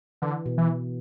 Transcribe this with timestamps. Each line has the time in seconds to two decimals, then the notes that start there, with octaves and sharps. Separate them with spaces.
0.22 D3 E3
0.46 B2
0.58 E3